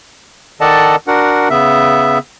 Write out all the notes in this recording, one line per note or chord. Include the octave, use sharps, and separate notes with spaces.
D#3 A4 D5 D#5 F#5 A5
D4 F#4 A#4 F#5
C#3 B3 E5